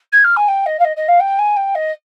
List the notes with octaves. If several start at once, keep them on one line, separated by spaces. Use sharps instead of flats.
G#6
F6
G#5
G5
D#5
F5
D#5
D#5
F5
G5
G#5
G5
D#5